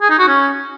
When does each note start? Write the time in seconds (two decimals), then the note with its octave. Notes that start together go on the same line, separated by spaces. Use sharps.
0.02 G#4
0.10 D#4
0.19 F#4
0.28 C#4